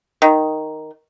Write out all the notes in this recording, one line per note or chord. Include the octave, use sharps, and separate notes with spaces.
D#3